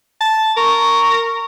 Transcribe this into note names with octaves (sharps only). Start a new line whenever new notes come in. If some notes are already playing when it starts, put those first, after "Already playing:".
A5
A#4 C#6